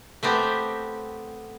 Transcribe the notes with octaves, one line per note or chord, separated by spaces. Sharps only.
A3 B3 C4 G4